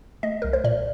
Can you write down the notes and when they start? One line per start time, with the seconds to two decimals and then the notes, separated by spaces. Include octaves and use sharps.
0.23 A3 D#5
0.42 C2 A#4
0.53 C5
0.64 A#2 D5